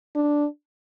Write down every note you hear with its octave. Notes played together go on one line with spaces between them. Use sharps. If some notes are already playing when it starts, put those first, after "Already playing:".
D4